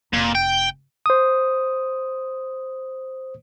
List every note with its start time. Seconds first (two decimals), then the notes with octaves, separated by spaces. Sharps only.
0.13 F1 A#2
0.35 G5
1.06 C5 D#6